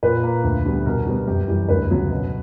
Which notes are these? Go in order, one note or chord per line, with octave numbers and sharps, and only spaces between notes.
A#2 B4
A#3
D2
D3 G3 B3
B2 A#4
G3 B3
F#2 G4
E3 G3 G4
D2 B4
C#3 F#3 B3
B2